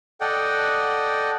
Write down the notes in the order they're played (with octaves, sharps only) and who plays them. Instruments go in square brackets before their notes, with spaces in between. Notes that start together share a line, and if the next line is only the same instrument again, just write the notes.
[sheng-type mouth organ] A4 D5 D#5 F#5 G5